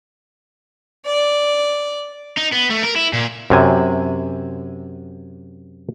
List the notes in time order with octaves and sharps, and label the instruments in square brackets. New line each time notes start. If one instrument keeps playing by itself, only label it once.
[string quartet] D5
[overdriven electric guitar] D#4
B3
A3
A#4
E4
A#2
[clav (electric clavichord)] F#2 C3 G#5